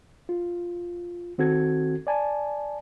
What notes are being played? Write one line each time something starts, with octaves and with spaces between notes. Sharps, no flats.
F4
D#3 C4 F#4 A4 G#6
D5 G#5 A5